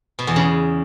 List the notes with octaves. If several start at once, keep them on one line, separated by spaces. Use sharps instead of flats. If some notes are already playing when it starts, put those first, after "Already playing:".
B2
E2
C#3